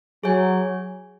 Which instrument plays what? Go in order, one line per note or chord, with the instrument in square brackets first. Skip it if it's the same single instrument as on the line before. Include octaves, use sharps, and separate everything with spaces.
[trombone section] F#3 [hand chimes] G#4 C#5 G#5